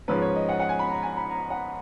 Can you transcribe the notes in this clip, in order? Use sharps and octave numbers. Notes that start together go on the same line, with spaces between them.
G#2 F3 G#3 C#4 B4
C#5
D#5
F#5
F#5
G#5
B5
A#5
G#5
B5
A#5
F#5